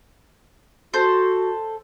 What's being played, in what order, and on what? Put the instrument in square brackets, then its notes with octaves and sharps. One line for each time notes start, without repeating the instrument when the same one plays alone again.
[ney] F#4 [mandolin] A4 C5